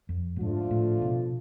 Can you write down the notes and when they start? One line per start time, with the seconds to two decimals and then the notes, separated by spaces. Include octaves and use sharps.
0.09 F2
0.36 A2
0.40 G#2 D3 F3 A3 D4 F4
0.71 A2
1.02 B2